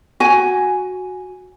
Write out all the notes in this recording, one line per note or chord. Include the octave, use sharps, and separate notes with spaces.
F#4 G#5